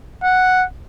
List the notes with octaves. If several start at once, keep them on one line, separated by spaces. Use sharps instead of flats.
F#5